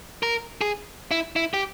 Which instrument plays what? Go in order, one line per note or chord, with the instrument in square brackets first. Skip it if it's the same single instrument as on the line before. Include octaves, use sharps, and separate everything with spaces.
[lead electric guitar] A#4
G#4
E4
E4
G4